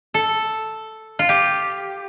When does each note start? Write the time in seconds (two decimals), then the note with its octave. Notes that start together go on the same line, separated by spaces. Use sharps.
0.14 A4
1.19 F4
1.29 G4